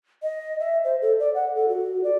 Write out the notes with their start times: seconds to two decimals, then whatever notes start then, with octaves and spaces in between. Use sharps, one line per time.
0.23 D#5
0.60 E5
0.84 C5
1.02 A4
1.20 D5
1.34 F#5
1.55 A4
1.69 F#4
2.04 D5